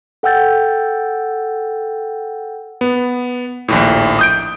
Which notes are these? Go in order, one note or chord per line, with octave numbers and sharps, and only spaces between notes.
A4 F#5 G5 E6 G6 A6
B3
A#1 D#2 A2
D#6 G6 D7